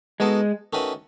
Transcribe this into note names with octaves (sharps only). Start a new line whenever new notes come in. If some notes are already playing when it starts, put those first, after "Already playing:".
G#3 B3 D#4 F#4 A4
D#3 A3 C#4 F#4 B4